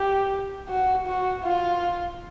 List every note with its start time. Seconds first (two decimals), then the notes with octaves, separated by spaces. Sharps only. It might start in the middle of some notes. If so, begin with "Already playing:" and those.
Already playing: G4
0.69 F#4
1.07 F#4
1.44 F4